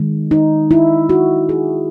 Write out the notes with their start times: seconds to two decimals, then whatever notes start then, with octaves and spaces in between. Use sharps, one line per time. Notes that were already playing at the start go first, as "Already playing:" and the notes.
Already playing: D#3 G#3
0.31 D#4
0.71 E4
1.09 F#4
1.49 G#4